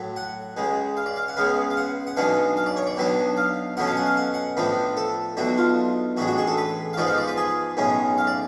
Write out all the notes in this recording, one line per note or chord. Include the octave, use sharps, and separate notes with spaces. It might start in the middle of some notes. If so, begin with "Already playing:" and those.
Already playing: A2 F#3 A3
F#5
C#2 C#3 G#3
F5
D5
F5
F#5
C#2 C#3 G#3 B3 F5
F5
F#5
F#5
B1 B2 G#3 B3 D4 F5
F5
D5
C#5
D5
B1 B2 F#3 B3 D4
F5
B2 F#3 A3 C#4 F#5
F5
F#5
F5
F#5
F#5
A2 F3 B3 D4
A4
B1 B2 A3 D4 F#4
F4
A1 A2 G#3 D4 F#4
F#4
G#4
A4
B4
F5
G#2 F3 G#3 B3 D5
F5
D5
B4
G#4
B1 A2 G#3 C#4
F5
D5